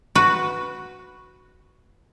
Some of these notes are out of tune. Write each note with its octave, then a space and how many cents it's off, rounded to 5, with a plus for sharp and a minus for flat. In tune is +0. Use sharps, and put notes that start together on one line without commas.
F#4 +0 B4 +0